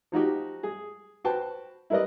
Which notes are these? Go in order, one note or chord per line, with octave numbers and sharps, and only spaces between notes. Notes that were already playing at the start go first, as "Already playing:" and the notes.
F3 D#4 F#4 G4
G#4
F#4 B4 C5 G5 A5
E4 A#4 B4 D5 D#5